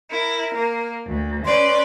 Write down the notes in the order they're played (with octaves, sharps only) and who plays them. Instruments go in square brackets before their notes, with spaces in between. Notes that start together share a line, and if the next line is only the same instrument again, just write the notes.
[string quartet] E4 [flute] A#4
[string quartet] A#3
D2
[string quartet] C#4 B4 D5 [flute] C6